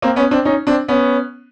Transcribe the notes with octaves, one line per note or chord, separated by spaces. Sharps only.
A#3 C4
B3 C#4
C4 D4
C#4 D#4
C4 D4
B3 C#4